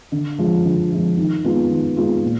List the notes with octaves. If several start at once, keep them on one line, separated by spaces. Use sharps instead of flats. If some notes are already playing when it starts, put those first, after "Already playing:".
D3
F3 G#3
D3
F3 G#3
D#3
G#3 B3 F4
D#3
G#3 B3 F4
A#2